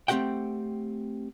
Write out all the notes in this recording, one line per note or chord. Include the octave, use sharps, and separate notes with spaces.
A3 C4 F#4 G4 F#5 G5